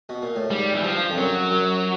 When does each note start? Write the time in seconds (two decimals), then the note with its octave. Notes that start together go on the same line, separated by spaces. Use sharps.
0.09 B2
0.22 A#2
0.36 A2
0.50 G#2 G3
0.75 E3
0.83 G2 F3
1.10 F2
1.17 F#2 F#3
1.51 F#2